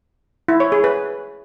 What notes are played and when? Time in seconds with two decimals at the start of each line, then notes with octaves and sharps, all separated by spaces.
0.48 E4
0.60 C#5
0.72 G#4
0.84 B4